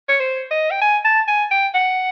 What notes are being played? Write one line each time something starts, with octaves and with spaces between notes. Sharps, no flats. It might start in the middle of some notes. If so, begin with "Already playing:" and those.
C#5
C5
D#5
G5
G#5
A5
G#5
G5
F#5